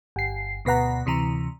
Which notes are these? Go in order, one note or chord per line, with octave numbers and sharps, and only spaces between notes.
G1 C7
D2 B2 B4 F#5 A#5
D2 C3 E3 A#5